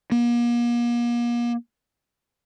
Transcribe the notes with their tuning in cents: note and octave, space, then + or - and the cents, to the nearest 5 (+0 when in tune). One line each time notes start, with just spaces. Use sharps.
A#3 +40